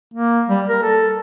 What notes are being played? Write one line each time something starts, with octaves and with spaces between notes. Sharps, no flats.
A#3
G3
A#4
A4